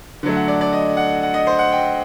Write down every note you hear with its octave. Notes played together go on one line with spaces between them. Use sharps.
D3 F#3 A3
F#5
D5
D5
D#5
F#5
F#5
D#5
C5
F#5
G5